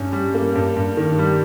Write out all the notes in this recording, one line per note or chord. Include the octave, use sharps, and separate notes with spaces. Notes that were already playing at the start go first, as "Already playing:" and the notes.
Already playing: G2 C#4
G3
A#3
G2
G2
D#3
G3